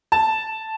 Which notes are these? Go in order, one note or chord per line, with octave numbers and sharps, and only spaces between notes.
A5